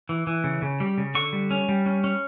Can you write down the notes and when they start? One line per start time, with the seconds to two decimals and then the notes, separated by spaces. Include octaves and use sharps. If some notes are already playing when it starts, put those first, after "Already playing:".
0.09 E3
0.27 E3
0.44 C#3
0.62 C#3
0.80 G3
0.98 C#3
1.15 D3 C#6
1.33 G3
1.51 C#4
1.69 G3
1.86 C#4
2.04 C#4